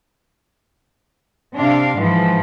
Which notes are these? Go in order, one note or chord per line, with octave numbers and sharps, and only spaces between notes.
C3 D4 F5
G#2 E3 F3